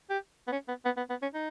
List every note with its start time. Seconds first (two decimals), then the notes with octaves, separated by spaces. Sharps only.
0.10 G4
0.47 B3
0.52 C#4
0.68 B3
0.85 B3
0.97 B3
1.10 B3
1.22 C#4
1.34 D#4